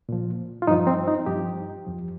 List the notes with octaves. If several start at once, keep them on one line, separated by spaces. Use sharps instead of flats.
A#2 F3
F4
G2 F3 D#4
C4
D#4
G2 F3 G4
F2 F3